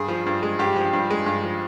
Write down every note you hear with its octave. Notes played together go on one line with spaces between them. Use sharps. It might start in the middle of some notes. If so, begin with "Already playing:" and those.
Already playing: G2 G#4
F3
G2
G#3
G2 G4
F3
G2
G#3
G2
F3